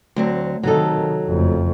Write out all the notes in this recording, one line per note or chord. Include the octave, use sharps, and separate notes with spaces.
D2 F#3 C4
C3 D#3 F#3 D#4 A4
F#1 F2 A3